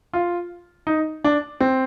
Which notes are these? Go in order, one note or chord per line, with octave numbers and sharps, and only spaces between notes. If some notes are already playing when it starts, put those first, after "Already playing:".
F4
D#4
D4
C4